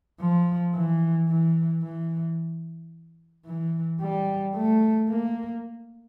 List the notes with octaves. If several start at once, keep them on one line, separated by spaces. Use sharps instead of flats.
F3
E3
E3
E3
E3
G3
A3
A#3